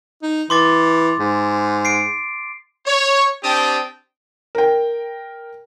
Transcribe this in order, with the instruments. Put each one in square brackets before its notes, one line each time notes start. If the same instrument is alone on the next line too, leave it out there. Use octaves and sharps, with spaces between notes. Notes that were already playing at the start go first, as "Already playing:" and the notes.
[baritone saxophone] D#4
[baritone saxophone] E3 [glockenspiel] C6 D6 A6
[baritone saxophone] G#2
[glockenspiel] C7 D7
[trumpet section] C#5
C4 D4 G4 G5 A5 D#6
[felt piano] A#4 G5